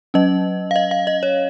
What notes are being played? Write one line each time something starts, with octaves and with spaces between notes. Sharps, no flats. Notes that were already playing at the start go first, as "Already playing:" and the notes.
F#3 C#4 D#5
F5
D#5
F5
D#5
C#5